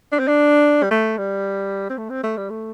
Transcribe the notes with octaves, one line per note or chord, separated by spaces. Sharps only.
D4
C4
D4
G3
A3
G3
C4
A3
C4
A3
G3
A3